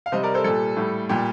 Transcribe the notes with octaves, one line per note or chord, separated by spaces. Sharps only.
F5
C3 G3 C5 D#5
A#4 D5
A4 C5
A#2 G3 A4
A2 G3
A#2 G3 G4